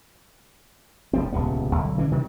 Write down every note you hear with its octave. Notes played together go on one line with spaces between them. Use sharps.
F1 F3 C4
D#1 C#2 C3 B3
B1 D3
D3 E3 C#4 D4
C3 D#3 E3 G3